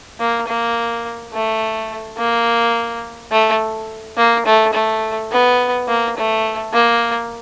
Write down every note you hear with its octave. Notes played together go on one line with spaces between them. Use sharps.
A#3
A#3
A3
A#3
A3
A#3
A3
A3
B3
A#3
A3
A#3